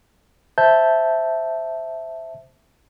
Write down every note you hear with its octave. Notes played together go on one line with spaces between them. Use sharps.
C5 E5 A5 G6